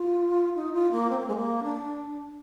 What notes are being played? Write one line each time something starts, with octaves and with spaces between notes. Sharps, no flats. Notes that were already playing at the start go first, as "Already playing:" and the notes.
Already playing: F4
D#4
F4
A#3
C4
A#3
G#3
A#3
D4